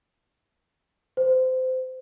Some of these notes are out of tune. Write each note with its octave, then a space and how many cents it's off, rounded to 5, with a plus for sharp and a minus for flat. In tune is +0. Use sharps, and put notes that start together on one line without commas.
C5 -25